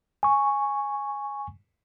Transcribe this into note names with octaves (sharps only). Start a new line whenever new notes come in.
G#5 C#6